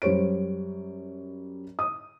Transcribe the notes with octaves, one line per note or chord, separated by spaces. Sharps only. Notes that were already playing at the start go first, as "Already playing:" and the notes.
F#2 G3 C5 C#5 D7
D#6